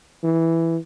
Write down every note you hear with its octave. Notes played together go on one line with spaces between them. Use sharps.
E3